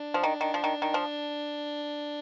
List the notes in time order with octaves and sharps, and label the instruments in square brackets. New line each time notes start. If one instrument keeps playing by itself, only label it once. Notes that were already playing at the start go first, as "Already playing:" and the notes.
Already playing: [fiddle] D4
[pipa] F3
D#3
D#3
F3
D#3
D#3
F3